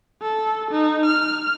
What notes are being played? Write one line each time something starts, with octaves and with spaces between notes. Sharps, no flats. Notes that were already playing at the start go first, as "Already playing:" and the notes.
A4
D#4
F6